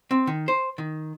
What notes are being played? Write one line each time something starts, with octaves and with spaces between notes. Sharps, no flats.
C4
D#3
C5
D#3